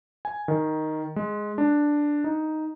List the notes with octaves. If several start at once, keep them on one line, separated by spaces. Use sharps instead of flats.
G#5
D#3
G#3
D4
D#4